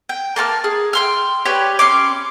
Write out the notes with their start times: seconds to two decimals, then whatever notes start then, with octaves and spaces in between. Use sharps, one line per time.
0.09 G5
0.36 A#3 A5 C#6 F6
0.64 G#4
0.93 G5 C6 F6
1.45 G4 B4 C#5 D5
1.79 C#4 C6 D6